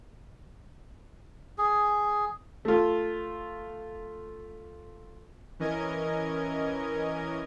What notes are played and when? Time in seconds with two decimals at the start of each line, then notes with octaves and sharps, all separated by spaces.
1.58 G#4
2.65 A3 F4
5.59 E3 C#4 A#4 D#5 G#6